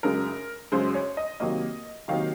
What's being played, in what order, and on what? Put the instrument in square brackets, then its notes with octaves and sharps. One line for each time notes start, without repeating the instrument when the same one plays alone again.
[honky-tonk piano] F#2 C#3 G#3 A#4
F#2 C#3 G#3 C5
C#5
D#5
C3 D#3 F#3 A#3 D#5
C3 D#3 F#3 A#3 F5